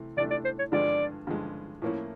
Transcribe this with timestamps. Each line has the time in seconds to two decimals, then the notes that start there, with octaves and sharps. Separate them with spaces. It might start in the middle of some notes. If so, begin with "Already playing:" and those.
Already playing: C3 E3 A3
0.17 C3 E3 A3 D4 D5
0.31 D5
0.44 C5
0.59 C#5
0.72 G2 D3 F3 G#3 D5
1.27 G2 D3 F3 G#3
1.82 A2 F3 A#3 C#4 E4